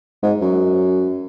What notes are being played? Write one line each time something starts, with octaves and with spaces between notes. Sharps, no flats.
G#2
F#2